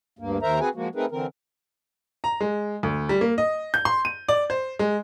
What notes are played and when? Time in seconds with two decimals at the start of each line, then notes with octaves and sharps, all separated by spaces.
0.19 D2 G2 A#3
0.42 D#2 D#3 A#4 C5 E5 A#5
0.60 C4 F#4 G#4 B4 G#5
0.75 F3 G#3 A#3 F#4
0.95 A3 C4 D#4 G#4 A#4 B4
1.11 D3 E3 C4 A#4
2.24 A#5
2.41 G#3
2.83 D2
3.09 G3
3.21 A#3
3.38 D#5
3.74 G6
3.85 C6
4.05 D#7
4.29 D5
4.50 C5
4.79 G#3